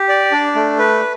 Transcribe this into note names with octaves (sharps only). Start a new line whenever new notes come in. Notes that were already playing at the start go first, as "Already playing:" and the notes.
Already playing: G4
D5
D4
A3
B4